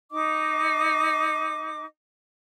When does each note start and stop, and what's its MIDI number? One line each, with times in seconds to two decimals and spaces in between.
0.11 1.85 63
0.11 1.85 75
0.11 1.85 86